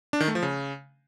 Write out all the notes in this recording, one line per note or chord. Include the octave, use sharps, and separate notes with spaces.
D4
D#3
A3
F3
C#3